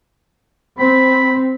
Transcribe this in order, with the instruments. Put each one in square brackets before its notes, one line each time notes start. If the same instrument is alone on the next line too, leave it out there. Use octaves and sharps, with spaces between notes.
[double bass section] C4 [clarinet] B5